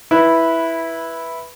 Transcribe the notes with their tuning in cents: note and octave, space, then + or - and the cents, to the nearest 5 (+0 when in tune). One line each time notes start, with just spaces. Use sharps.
E4 +0 B4 -10